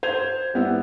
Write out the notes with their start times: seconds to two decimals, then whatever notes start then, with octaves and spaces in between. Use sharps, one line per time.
0.03 C5 G#6 F7
0.54 G3 B3 E4